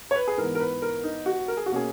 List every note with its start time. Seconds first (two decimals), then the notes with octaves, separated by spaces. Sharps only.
0.11 C#5
0.16 B4
0.28 G#4
0.38 G#2 E3 B3 A#4
0.55 A#4
0.60 B4
0.82 A#4
1.03 D#4
1.26 F#4
1.48 A#4
1.57 G#4
1.66 F#4
1.71 B2 A#3 C#4 G#4